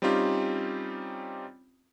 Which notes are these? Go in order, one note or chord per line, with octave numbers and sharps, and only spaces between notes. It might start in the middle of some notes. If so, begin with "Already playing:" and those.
G3 C4 C#4 D#4 F4 G4